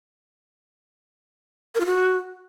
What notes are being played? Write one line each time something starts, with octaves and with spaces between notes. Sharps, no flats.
A#4
F4
F#4